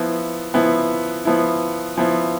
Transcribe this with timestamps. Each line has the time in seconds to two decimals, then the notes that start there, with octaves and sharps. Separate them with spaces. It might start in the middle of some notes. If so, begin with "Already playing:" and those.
Already playing: F3 B3 E4
0.54 F3 B3 E4
1.25 F3 B3 E4
1.98 F3 B3 E4